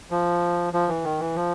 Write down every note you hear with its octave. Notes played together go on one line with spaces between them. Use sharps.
F3
F3
E3
D#3
E3
F3